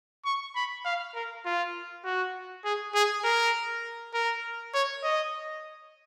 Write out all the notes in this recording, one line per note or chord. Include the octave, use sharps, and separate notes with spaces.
C#6
B5
F5
A#4
F4
F#4
G#4
G#4
A#4
A#4
C#5
D#5